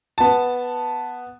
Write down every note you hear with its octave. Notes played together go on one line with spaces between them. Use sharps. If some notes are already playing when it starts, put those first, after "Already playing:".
B3 A5